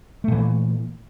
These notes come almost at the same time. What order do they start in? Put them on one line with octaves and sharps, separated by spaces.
A3 A#2 E3